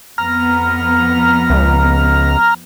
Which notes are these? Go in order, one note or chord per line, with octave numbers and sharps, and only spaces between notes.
F2 B3 A#5 F6
C#2